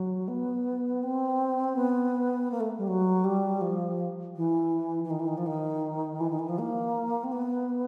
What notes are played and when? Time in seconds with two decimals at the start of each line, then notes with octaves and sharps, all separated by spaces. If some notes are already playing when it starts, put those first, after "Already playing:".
Already playing: F#3
0.28 B3
1.03 C4
1.76 B3
2.51 A#3
2.60 A3
2.78 G3
2.87 F#3
3.24 G3
3.61 F3
4.36 E3
5.04 E3
5.10 D#3
5.19 E3
5.28 D#3
5.37 F3
5.46 D#3
6.20 E3
6.30 D#3
6.39 E3
6.49 F3
6.58 A#3
7.23 C4
7.32 B3